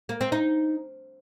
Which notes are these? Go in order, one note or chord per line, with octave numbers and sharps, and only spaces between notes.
A#3
C4
D#4